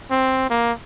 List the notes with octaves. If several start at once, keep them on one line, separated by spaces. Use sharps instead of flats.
C4
A#3